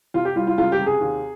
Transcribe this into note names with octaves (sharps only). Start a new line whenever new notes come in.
C3 F4
G4
G3 F4
F4
C#2 F4
G4
C3
G#4
D#2